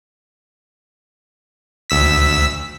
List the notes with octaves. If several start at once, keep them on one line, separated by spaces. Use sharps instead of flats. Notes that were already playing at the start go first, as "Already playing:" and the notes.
D2 E6 B6